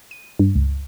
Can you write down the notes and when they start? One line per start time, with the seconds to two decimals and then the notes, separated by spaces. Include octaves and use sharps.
0.11 D#7
0.39 G2
0.55 C#2